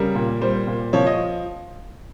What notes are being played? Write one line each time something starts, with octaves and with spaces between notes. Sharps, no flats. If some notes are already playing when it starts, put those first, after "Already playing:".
Already playing: C#3 G3 A#4
A#2
G3 C5
A#2
F3 C#5
D#5